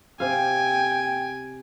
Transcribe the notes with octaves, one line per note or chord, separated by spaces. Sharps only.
C3 F5 G5 G#5